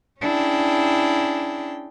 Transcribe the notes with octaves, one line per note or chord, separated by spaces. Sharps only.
C#4 D4 E4 G#4 G5